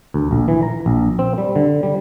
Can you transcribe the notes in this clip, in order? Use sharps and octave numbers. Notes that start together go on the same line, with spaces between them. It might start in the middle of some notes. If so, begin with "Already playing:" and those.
D2
A#1
E3
A#5
A#1
C4
G3
D3
G3